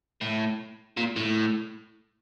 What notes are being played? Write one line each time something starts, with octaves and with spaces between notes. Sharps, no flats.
A2
A#2
A2